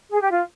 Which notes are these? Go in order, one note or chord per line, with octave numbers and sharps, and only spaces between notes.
G#4
G4
F4